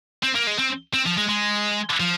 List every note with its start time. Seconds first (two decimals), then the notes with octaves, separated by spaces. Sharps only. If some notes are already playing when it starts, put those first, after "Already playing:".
0.23 C4
0.35 A#3
0.47 G#3
0.59 C4
0.94 C4
1.06 F3
1.18 G#3
1.29 G#3
2.00 F3